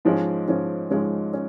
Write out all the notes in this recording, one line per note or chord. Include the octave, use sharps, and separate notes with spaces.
G#2 F3 G#3 C#4
G#2 F3 G#3 C#4
G#2 F3 G#3 C#4
C#4